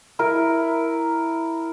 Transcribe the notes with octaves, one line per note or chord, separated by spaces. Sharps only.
E4 A#4